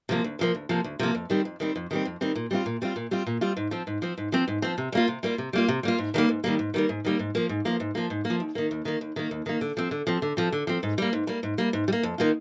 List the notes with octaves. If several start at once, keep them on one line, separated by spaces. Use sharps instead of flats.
C3 F3 A#3
D2
C3 F3 A#3
D2
C3 F3 A#3
D2
C3 F3 A#3
F2
D#3 G3 C4
F2
D#3 G3 C4
F2
D#3 G3 C4
F2
D#3 G3 C4
A#2
G3 C4 F4
A#2
G3 C4 F4
A#2
G3 C4 F4
A#2
G3 C4 F4
G#2
F3 C4
G#2
F3 C4
G#2
F3 C4
G#2
F3 C4
C3
G3 A#3 F4
C3
G3 A#3 F4
C3
G3 A#3 F4
C3
G3 A#3 F4
G#2
D#3 G3 A#3
G#2
D#3 G3 A#3
G#2
D#3 G3 A#3
G#2
D#3 G3 A#3
G#2
F3 A#3
G#2
F3 A#3
G#2
F3 A#3
G#2
A#3
F3
D#2
D#3 A#3
D#2
D#3 A#3
D#2
D#3 A#3
D#2
D#3 A#3
D3
F3 C4
D3
F3 C4
D3
F3 C4
D3
F3 C4
G#2
G3 A#3
G#2
G3 A#3
G#2
G3 A#3
G#2
G3
A#3
F2
D#3 A#3 F4